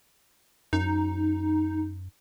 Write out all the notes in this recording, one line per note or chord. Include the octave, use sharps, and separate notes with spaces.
F#2 D#4